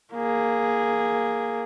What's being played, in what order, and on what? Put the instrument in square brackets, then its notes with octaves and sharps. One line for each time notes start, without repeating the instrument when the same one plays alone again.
[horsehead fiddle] A#3 G#4